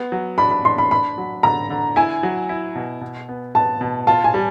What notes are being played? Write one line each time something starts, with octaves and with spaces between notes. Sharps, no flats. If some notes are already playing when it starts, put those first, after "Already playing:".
Already playing: B3
F#3
D4 B5
B5
D4 C6
B5
D4 B5
F#3
D3 A#5
D3
E4 G#5
F#3
E4
B2
B2
B3
B3 A5
B2
F4 A5
G#5
G3